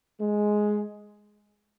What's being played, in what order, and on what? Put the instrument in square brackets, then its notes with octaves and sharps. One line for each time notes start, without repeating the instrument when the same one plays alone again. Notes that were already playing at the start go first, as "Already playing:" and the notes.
[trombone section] G#3